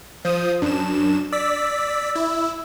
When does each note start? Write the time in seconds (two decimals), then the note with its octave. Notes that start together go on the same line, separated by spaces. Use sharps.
0.25 F3 C5 D#6
0.62 F#2 D4 E7
1.32 D5 E6 B6
2.15 E4